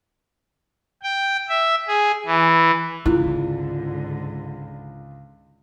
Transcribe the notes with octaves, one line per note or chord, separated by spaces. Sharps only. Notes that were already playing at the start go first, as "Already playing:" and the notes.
G5
E5
G#4
E3
C#2 G#2 D3 G#3 E4 F4 F#6